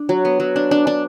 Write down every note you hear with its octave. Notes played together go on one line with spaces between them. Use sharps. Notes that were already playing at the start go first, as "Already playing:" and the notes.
Already playing: D4
F#3
B3
F#3
D4
D4
D4